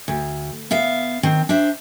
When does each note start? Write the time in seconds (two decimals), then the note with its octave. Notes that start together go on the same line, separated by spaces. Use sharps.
0.08 D2
0.71 B3 E5 F5
1.23 D#3 C4
1.49 D4 C5 E5